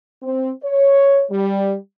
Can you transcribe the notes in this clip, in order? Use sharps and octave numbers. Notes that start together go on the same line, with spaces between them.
C4
C#5
G3